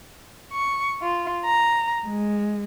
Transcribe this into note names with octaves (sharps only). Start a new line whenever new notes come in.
C#6
F4
A#5
G#3